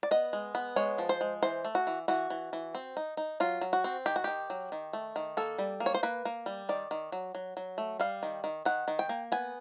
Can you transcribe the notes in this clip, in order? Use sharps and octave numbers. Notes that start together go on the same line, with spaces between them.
D5
B3 D#5
G#3
B3
G#3 C#5
F3
C5
G#3
E3 C5
A3
F#4
E3
E3 F#4
E3
E3
C4
D#4
D#4
F#3 F4
F#3
F#4
C4
D#3 G4
F#4
D#3 G4
F#3
D#3
A3
D#3
A#3 A4
G3
A#3
C#5
C5
A#3 B4
A#3
G3
D#3 D5
D#3
F#3
F#3
F#3
A3
G3 F5
D#3
D#3
D#3 F#5
D#3
G5
A#3
B3 G#5